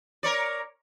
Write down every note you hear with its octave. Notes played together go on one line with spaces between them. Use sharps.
A#4 C#5 D5